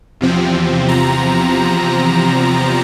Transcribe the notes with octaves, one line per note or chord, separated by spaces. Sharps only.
E2 C3 F3 C4
A#5